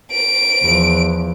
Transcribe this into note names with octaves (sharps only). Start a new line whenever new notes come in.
D7
E2 F3